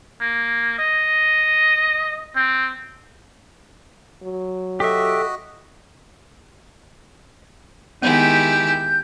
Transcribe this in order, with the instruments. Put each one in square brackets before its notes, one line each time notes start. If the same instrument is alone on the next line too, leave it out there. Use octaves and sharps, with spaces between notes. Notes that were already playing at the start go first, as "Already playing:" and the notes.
[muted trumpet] A#3
D#5
C4
[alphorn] F#3
[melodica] F#4 D#5 [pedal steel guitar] G4 E5 [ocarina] A4
[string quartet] D#3 G#3 [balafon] B3 [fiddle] E4 G4 [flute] G6